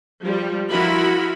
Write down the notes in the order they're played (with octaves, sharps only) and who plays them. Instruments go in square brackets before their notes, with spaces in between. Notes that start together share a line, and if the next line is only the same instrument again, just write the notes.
[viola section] F3 G3
F3 E4 F#4 A#4 B5